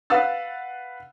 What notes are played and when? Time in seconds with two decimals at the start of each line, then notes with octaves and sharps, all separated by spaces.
0.10 B4 F5 F#5 E6 A6